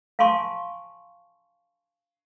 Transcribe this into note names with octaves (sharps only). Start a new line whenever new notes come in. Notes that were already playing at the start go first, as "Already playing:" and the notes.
F5 G#5 A5 C6 C#6